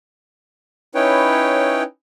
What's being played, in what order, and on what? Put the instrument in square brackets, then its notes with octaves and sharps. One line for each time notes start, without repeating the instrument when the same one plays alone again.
[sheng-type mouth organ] C#4 D#4 E4 B4 C#5 G5